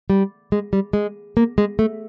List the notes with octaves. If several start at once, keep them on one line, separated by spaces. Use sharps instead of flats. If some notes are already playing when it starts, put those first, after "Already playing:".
G3
G#3
G3
G#3
A#3
G#3
A3